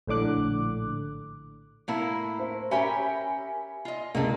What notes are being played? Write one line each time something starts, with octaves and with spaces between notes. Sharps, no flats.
A#1 A2 D3 D6 F#6
A2 A#3 E4
C5
C#4 G4 A#4 E5 G#5 B5
F4 D#5
C#2 A2 G3 A#3